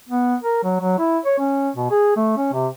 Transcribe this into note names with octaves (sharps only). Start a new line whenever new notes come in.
B3
A#4
F#3
F#3
E4
C#5
C#4
B2
G#4
A3
C#4
C3